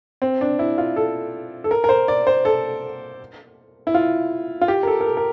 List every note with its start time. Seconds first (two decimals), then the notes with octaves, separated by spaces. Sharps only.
0.22 C4
0.41 D4
0.59 E4
0.78 F4
0.96 A4
1.64 A4
1.71 A#4
1.84 A#4
1.89 C5
2.08 D5
2.27 C5
2.45 A4
3.87 E4
3.94 F4
4.61 F4
4.68 G4
4.83 A#4
4.87 A4
5.01 A#4
5.06 A4
5.17 A#4